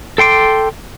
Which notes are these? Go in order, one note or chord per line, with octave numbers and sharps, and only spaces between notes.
A4 G5 C6 D6